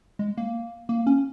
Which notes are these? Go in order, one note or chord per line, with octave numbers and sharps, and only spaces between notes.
G#3
A#3
A#3
C#4